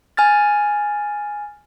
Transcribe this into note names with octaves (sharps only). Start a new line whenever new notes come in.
G#5 F6 A6